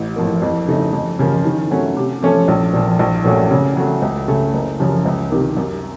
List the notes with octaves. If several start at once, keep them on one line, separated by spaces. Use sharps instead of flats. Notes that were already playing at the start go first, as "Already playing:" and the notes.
Already playing: A1
A2 F3 A#3
F2
C#3 A3 D#4
F2
C#3 F3 A#3
D#3
F#3 A3 C#4
C3
F3 A3 C#4 A4
A#1
A#2 F3
A#1
A#2 F#3 A3 C#4
C#3
F#3 A3
C#2
C#3 A3
F#1
F#2 C#3 F3
C#2
C3 D#3 A#3
F#2